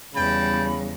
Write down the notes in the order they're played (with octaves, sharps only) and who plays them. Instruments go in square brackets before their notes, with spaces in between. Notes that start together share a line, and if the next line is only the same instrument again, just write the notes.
[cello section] E2 G3 [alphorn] C#3 [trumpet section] G5 A5 [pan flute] B5